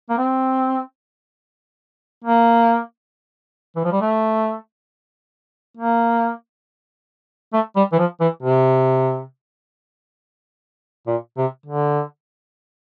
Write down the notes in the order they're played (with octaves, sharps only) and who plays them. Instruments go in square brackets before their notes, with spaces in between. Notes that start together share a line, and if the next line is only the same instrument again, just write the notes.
[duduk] A#3
C4
A#3
E3
F3
G3
A3
A#3
A3
G3
E3
F3
E3
C3
A#2
C3
D3